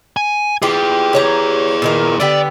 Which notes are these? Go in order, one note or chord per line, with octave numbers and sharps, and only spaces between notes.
G#5
E4 F4 G4 G#4
G4 C#5 A#5
A#2 D#3 A#4
D3 B3 G4 D5